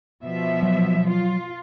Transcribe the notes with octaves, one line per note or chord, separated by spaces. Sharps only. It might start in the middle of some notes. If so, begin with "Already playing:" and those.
B2 F3 E5
F#3
F4